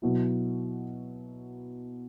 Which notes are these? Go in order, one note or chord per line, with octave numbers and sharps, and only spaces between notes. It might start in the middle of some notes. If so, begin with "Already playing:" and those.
B2 F#3 B3 E4